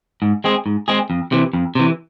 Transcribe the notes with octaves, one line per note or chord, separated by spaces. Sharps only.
G#2
G#3 C4 G#4
G#2
G#3 C4 G#4
F2
C3 E3
F2
C3 E3